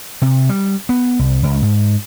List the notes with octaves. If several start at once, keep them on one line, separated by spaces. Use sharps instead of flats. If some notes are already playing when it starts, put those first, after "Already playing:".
C3
G3
B3
C2
C#2
G#2